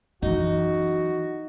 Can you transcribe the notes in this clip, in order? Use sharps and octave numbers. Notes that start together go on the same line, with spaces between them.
F#2 E3 D#4 F#4